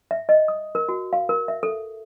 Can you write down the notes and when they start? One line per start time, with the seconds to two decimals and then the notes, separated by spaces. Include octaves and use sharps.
0.11 E5
0.29 D#5
0.48 D#6
0.75 A#4
0.89 F#4
1.13 F5
1.29 A#4
1.48 E5
1.63 A4